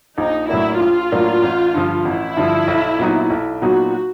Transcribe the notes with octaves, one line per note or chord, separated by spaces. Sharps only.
A#1 D#4
A2 F#3 A#3 D4 E4
A#1 F4
A2 F#3 A#3 D4
A1
G2 D3 F3
A1 E4
G2 D3 F3
B1
A#2 F#3 B3 D#4
B1
A#2 F#3 B3 D#4 F#4